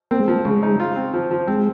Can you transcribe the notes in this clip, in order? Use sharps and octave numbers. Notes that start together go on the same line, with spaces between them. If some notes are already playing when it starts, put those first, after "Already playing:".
A#3 C4
G#3
F3 A#3
C#3 G#3
D#4
F4
C4
F3
F3
G#3 C4